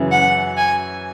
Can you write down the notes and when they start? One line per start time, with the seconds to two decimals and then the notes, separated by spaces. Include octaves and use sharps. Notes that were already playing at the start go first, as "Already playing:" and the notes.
Already playing: F#2 C#3 E3
0.12 F#5
0.57 G#5